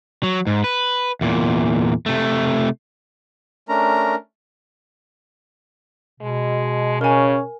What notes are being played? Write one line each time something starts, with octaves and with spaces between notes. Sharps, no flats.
F#3
G#2
B4
E2 A#2
C3 A3
A3 C#4 D4 A#4 A#5
B2 G#3
C#3 C#4 A#4 G#5